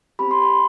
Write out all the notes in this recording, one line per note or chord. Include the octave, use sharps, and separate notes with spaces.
C4 G4 B5
C6
B5